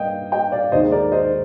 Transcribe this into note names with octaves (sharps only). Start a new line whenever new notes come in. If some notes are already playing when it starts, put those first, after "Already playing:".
Already playing: G2 A#3 A#4 D5 D#5 F5 G5
D#5 G5
D5 F5
D#2 D#3 G#3 C5 D#5
A#4 D5
C5 D#5